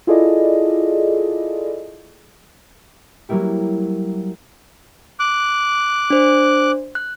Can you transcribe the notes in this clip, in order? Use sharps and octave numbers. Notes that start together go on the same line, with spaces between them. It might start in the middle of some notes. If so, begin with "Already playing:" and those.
E4 F4 G#4 A4 D5 D#5
F#3 G3 A#3 E4 G4
D6 F#6
D4 C5
F#6